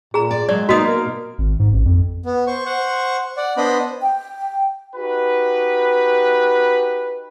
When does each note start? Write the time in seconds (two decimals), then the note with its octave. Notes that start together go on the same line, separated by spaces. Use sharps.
0.14 A#2 G#4 A#5
0.31 D5
0.49 F#3 G#3 D5
0.69 B2 A#3 D#4 F#4 D#5 D#6
0.86 A#4
1.38 G#1
1.59 G#2
1.72 A1
1.85 F2
2.26 B3
2.47 C5 C#6
2.65 C5 F#5 C#6
3.37 D5 F#5
3.57 B3 D4 C5 D#5 B5
4.02 G5
4.96 D#4 F#4 G4 B4